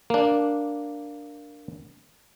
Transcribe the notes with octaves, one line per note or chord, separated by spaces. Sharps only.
A#3 D4